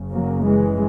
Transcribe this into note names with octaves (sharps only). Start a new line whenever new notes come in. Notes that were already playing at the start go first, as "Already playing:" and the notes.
Already playing: F#1 F#2 C#3
F#3 A#3
E3 G#3